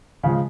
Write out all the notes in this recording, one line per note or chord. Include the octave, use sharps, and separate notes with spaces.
C#3 F3 G#3